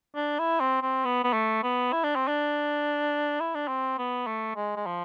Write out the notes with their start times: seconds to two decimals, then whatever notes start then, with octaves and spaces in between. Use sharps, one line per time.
0.16 D4
0.39 E4
0.60 C4
0.82 C4
1.05 B3
1.24 B3
1.33 A3
1.63 B3
1.93 E4
2.04 D4
2.15 C4
2.28 D4
3.40 E4
3.55 D4
3.68 C4
3.98 B3
4.27 A3
4.56 G#3
4.76 G#3
4.86 F3